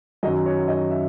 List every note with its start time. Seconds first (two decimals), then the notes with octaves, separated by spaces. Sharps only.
0.23 F#2 D#3 F#3 D#5
0.46 C#5
0.68 D#5
0.91 E5